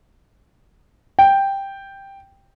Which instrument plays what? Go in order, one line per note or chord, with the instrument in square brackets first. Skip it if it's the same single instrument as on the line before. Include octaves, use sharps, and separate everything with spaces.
[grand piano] G5